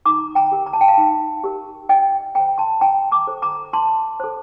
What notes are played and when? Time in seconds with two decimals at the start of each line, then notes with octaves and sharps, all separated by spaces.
0.06 D#4 A#5 D6
0.35 G5 A#5
0.52 G4 A#4
0.66 A#5
0.73 A5
0.81 G5
0.88 F5 A5
0.97 D#4
1.44 G4 A#4
1.89 F4 D#5 G5
2.35 A4 C5 G5 A#5
2.58 A5 C6
2.81 F4 G5 A#5
3.12 A#5 D6
3.27 A4 C5
3.42 A#5 D6
3.73 F4 A5 C6
4.20 A4 C5